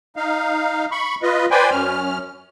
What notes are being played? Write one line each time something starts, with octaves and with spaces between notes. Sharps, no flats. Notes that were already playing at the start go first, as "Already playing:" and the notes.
D#4 F5
B5 C#6
F4 B4 D#5
B4 C5 D5 G5 G#5
F#2 C#4 F6